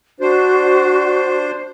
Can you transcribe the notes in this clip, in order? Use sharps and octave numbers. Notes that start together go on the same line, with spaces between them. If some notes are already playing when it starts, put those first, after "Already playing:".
D4 F#4 C5